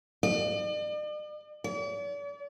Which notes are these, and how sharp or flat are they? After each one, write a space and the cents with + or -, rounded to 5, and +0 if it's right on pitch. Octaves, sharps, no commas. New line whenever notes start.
D5 +45
D5 -45